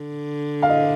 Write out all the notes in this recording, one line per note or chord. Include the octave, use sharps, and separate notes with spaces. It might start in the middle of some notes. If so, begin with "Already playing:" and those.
Already playing: D3
F5
D#5